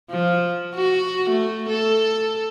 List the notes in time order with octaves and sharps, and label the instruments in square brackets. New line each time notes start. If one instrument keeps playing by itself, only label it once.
[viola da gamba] F3
F#4
A3
A4